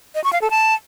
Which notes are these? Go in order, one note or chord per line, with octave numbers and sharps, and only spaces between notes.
D#5
C#6
F5
A4
A5